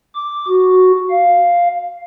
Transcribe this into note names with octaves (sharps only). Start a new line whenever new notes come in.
D6
F#4
F5